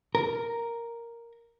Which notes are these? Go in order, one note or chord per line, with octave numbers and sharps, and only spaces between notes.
A#4